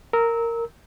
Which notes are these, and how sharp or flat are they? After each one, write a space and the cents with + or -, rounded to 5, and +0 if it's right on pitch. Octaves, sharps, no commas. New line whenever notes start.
A#4 -10 E6 -25